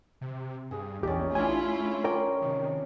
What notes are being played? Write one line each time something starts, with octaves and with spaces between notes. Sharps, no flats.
C3
G2 G#4
A#1 E2 D#3 C#4 G4 D5
A3 C#4 D4 E4 F4 G#5 B5
F3 C#4 A#4 D5 G5
C3 D#3 E3